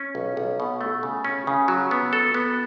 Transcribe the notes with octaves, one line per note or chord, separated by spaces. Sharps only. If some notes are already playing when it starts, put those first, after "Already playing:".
Already playing: C#4
B1
B1
B2
A3
C#3
C#4
C#3
F#3
B3
A4
B3